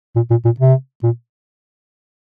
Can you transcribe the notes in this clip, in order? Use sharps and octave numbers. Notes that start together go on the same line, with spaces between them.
A#2
A#2
A#2
C3
A#2